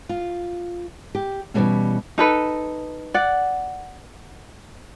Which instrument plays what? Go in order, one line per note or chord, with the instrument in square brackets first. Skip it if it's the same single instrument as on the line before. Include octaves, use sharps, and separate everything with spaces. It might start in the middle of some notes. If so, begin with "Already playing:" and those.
[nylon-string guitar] F4
G4
B2 E3 F#3 G3 A#3 C#4
[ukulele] D#4 A4 B4
D5 F#5